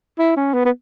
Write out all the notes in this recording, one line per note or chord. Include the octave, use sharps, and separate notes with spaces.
E4
C#4
B3
B3